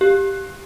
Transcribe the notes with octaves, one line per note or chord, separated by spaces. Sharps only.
G4